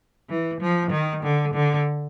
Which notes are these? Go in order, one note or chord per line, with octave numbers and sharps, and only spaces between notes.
E3
F3
D#3
D3
D3